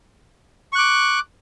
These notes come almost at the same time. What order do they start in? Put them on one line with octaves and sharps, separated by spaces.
C#6 F#6 D6